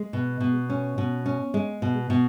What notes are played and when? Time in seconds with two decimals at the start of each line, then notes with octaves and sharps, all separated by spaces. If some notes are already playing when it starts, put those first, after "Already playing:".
Already playing: G#3
0.13 B2
0.40 B2
0.70 C#4
0.98 B2
1.26 C#4
1.54 G#3
1.82 B2
2.10 B2